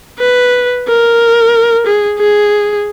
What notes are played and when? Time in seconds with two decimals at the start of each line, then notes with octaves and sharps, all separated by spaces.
0.19 B4
0.88 A#4
1.86 G#4
2.19 G#4